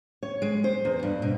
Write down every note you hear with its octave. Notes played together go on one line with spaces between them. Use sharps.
C#5
G#3
C5
E2
G2
B2